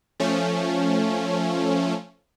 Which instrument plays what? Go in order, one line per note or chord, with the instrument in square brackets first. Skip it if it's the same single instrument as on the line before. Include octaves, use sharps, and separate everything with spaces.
[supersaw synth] F3 A3 C#4